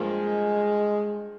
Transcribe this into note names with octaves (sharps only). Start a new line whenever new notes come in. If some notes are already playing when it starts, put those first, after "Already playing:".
Already playing: G2 F3 G#3 A#3